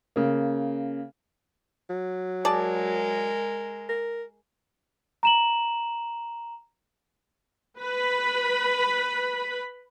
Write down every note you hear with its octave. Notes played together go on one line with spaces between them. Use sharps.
C#3 A#3
F#3
G#3 G#4 A#4 D5 A5
A#4
A#5 E7 F#7
B4 B5